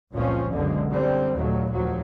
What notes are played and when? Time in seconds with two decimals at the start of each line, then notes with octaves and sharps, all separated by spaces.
0.12 F#1 C#2 A#2 F3 C4 C#4
0.51 F#1 C#2 F#2 B2 D3 G#3
0.90 D3 G3 C4
1.32 F#1 D#2 A#2 F#3 A3
1.72 F1 D#2 F3 F#3